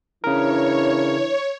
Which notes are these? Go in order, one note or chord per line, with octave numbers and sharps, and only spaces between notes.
C#3 E3 D4 E4 A#4 C#5